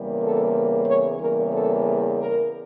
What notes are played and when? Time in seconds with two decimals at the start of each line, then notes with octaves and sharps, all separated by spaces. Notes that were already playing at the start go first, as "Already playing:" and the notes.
Already playing: E2 C#3 G3 A#3
0.21 A4
0.86 C#5
1.19 E2 C#3 G3 A#3 A#4
1.51 A4
2.16 A#4